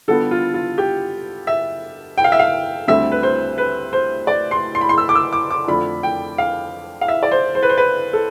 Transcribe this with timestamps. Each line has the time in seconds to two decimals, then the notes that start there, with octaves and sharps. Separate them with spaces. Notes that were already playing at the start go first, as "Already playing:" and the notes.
0.08 D3 G3 B3 F4 A4
0.31 F4
0.54 F4
0.78 G4
1.47 E5
2.18 G5
2.24 F5
2.32 E5
2.39 F5
2.88 D2 D3 G3 C4 E5
3.12 B4
3.23 C5
3.58 B4
3.93 C5
4.27 D5
4.51 C6
4.75 C6
4.81 B5
4.89 C6
4.98 E6
5.09 D6
5.15 E6
5.33 D6
5.51 D6
5.67 F2 D3 A3 D4 F4 B5
6.03 G5
6.38 F5
7.01 F5
7.08 E5
7.23 D5
7.32 C5
7.55 C5
7.63 B4
7.69 C5
7.78 B4
8.13 A4